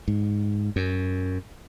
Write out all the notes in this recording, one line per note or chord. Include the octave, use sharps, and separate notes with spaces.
G#2
F#2